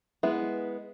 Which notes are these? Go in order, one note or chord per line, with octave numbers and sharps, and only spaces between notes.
G#3 B3 E4